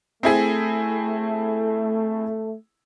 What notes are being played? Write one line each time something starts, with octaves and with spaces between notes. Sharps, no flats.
A3 C4 E4 G#4